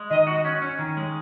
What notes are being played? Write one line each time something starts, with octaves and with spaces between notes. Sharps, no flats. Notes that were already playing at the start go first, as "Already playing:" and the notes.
Already playing: G#3
D#3 D#5
F#4
C#4
C#4
D#3
G#3